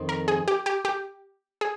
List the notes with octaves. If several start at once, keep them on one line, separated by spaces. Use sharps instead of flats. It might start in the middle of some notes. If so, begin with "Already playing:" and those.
Already playing: F2 D#3 C4 D#4
A#4
G#4
G4
G4
G4
G#4